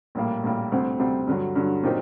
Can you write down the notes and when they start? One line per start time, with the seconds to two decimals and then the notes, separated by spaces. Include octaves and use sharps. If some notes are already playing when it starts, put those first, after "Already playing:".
0.15 A#1 A2 G3 A#3
0.43 A#1 A2 G3 A#3
0.72 D2 C3 G3 C4
0.99 D2 C3 G3 C4
1.27 G2 D3 F#3
1.55 G2 D3 F#3
1.83 A#2 F#3 C4 D#4 G4